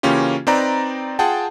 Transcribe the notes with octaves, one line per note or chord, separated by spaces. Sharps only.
C#3 E3 A#3 C#4 F4 G4
C4 D#4 B4 D5 G5 A#5
F4 G#4 F#5 G5 A5